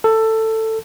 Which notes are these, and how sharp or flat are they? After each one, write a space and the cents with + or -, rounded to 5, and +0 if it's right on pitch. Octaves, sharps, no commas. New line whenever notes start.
A4 +15